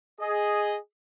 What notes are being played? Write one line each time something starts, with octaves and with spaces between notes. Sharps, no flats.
G#4 D#5